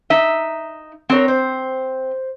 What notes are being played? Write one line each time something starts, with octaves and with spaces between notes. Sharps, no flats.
D#4 E5
C4 F#4 A#4 C#5
C5